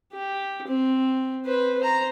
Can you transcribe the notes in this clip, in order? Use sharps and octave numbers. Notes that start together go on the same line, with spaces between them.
G4
C4
B4 C5
C5 A#5